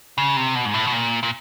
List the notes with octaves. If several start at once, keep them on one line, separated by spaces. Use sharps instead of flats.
C#3
C3
B2
G#2
A2
B2
A#2
A#2